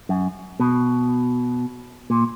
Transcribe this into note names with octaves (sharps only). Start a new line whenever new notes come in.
F#2
B2
A#2